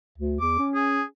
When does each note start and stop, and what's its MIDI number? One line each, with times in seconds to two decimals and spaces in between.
0.18 0.36 38
0.40 0.55 40
0.40 0.65 86
0.58 1.01 61
0.75 1.03 68